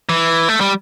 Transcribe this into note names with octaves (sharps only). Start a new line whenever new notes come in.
E3
A3
G3